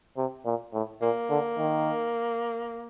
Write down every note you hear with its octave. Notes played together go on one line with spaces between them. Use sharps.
C3
A#2
A2
A#2 A#3
D3
D#3